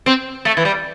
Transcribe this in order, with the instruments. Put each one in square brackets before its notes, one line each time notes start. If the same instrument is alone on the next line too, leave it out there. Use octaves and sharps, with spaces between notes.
[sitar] C4
A3
E3
G3